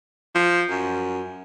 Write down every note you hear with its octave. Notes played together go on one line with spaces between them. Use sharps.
F3
F#2